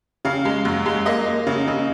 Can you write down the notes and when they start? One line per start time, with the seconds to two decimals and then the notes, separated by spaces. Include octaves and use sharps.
0.25 C#3 F5
0.45 G#3
0.65 F#2
0.86 G#3
1.06 A#3 D#5
1.26 A#3
1.47 C#3
1.67 C#3